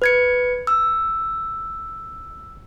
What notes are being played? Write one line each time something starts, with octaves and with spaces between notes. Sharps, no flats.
B4 G#6 C#7
E6